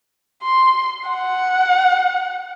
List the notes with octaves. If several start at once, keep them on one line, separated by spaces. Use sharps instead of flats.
C6
F#5